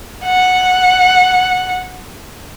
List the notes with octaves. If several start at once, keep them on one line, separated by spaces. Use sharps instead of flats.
F#5